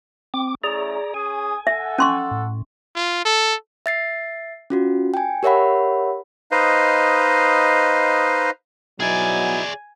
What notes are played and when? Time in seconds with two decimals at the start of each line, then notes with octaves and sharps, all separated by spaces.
0.34 C4 D6
0.64 A3 C#4 E4 G#4 D5 A#5
1.14 C#4 G#4 G#5 D#6
1.67 A4 E5 F#5
1.98 C#4 C6 C#6
2.31 A2
2.95 F4
3.25 A4
3.86 E5 A6 C7
4.70 C#4 F4 F#4
5.14 G5 G#5
5.43 G4 A#4 C#5 E5 F#5 B5
6.51 D#4 B4 C5 D#5 F5
9.00 B2 F#3 D#4 E4 G#4 D5 G#5